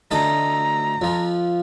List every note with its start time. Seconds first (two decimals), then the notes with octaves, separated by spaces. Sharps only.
0.11 D2 A4 D#5 A#5
1.01 F2 F3